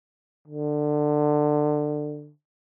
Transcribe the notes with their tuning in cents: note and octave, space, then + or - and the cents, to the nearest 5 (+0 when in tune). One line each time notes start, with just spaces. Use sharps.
D3 +20